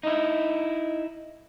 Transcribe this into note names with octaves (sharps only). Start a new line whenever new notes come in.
D#4 E4